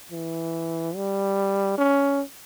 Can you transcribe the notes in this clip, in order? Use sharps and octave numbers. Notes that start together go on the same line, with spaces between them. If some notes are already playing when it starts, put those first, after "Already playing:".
E3
G3
C#4